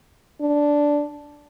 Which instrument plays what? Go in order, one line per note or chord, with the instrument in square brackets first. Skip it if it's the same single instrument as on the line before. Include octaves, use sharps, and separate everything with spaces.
[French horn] D4